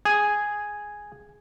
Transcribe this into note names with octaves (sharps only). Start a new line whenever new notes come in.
G#4